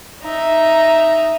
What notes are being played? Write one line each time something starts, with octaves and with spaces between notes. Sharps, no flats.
D#4 E5